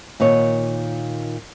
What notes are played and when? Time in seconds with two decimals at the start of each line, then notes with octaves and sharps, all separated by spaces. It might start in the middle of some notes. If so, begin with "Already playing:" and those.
0.20 A#2 D#3 C#5